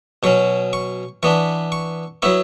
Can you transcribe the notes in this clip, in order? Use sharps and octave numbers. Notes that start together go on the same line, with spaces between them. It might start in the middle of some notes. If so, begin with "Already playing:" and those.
B2 F#3 C#4 C#6
C#6
E3 B3 D4 C#6
C#6
F#3 B3 E4 C#6